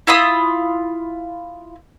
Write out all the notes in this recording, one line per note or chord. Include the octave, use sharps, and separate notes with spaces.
E4 F4 B5 D#6